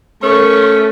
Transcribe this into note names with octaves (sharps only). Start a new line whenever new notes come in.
A3 C#4 A#4 C#6